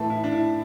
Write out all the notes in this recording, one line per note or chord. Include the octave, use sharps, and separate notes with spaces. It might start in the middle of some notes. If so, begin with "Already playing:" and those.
Already playing: A2 E3 A3 A4
E4
D4
E4